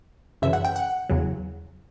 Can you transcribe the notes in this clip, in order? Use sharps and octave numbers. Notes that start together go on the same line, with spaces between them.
F#2 C#3 E3 E5
F#5
G5
F#5
E2 C#3 F#3